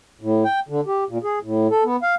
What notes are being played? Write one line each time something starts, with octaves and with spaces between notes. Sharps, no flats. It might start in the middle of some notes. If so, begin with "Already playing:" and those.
A2
G5
D3
G4
A#2
G#4
A2
A4
B3
F5